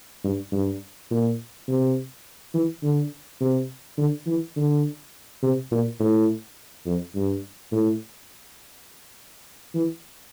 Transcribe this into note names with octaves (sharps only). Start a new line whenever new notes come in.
G2
G2
A#2
C3
E3
D3
C3
D3
E3
D3
C3
A#2
A2
F2
G2
A2
E3